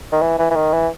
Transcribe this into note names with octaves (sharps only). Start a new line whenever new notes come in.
D#3
E3
E3
E3
D#3
E3